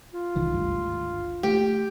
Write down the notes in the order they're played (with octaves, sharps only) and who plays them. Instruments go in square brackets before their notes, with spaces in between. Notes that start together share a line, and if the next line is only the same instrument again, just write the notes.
[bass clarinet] F4
[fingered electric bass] C2 D#3 E3
G#1 D2 G2
[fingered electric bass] A3 [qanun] G4